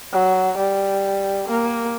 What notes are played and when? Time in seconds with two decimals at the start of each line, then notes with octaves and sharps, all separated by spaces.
0.13 F#3
0.58 G3
1.48 A#3